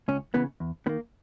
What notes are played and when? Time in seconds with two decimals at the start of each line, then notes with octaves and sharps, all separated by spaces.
0.08 C#2 C#4
0.34 C#3 E3 B3
0.60 E2
0.86 D#3 B3
0.89 A#3